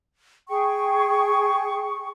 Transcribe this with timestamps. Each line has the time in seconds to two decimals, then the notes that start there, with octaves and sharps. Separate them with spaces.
0.48 G#4 G5 C#6